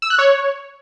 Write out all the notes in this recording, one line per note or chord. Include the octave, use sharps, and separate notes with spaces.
E6
F#6
C#5